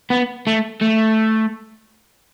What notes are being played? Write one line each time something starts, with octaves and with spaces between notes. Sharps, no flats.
B3
A3
A3